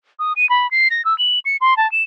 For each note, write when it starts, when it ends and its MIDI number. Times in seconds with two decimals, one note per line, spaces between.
0.19 0.33 87
0.36 0.48 99
0.49 0.69 83
0.71 0.88 96
0.91 1.04 94
1.05 1.16 88
1.18 1.39 102
1.45 1.57 97
1.61 1.77 84
1.77 1.90 81
1.92 2.03 100